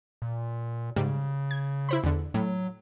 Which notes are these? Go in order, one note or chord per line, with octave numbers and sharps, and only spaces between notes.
A#2
G#2 C#3 G3
G#6
E4 C5 B5
E2 D3
A2 F#3